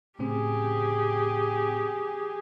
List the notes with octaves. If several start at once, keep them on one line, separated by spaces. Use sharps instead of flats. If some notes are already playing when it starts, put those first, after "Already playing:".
A2 C#3 C4 G4 G#4